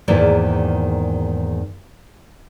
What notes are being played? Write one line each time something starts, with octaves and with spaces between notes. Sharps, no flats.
E2 G#2 D#3 A#3 E4 D5